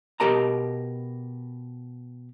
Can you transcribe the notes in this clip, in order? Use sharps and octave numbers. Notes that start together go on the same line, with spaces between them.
B2 G4 A#4 D#5 A5 A#5